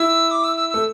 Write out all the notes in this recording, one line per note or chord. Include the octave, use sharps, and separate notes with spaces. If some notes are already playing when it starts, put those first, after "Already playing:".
Already playing: E4 E6
D6
E6
E6
A3 E6